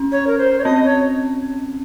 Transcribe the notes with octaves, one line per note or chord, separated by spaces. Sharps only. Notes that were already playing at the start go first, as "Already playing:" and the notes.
Already playing: C#4
C#5
A#4
C5
C#5
C4 D#5
C#5